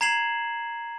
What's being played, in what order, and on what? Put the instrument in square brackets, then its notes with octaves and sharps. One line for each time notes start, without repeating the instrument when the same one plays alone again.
[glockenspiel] A#5 G#6 C7 E7 F#7